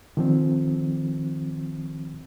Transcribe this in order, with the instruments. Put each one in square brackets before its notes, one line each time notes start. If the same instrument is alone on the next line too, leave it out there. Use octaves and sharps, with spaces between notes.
[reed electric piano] D#3 F3 C4